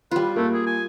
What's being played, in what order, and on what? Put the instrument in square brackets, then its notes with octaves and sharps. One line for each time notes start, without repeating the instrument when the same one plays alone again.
[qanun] G3 F4 [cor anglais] B4
[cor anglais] A3 [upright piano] A#3
[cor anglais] G#4
G#5